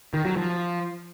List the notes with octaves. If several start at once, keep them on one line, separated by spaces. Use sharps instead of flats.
D#3
F#3
F3